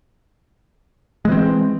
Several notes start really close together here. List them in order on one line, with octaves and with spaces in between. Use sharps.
G#3 E3 C4